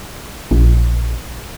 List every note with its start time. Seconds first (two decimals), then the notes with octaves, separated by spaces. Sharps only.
0.51 A#1